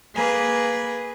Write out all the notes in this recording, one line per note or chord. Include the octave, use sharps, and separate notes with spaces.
A#3 G#4 B4